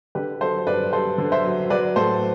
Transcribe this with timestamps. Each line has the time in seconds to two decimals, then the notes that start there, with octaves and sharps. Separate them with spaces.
0.15 D3 G4 B4
0.41 F#3 A4 C5
0.67 G2 B4 D5
0.93 G2 A4 C5
1.18 D3
1.32 C5 E5
1.44 F#3
1.70 F#3 B4 D5
1.96 A2 A4 C5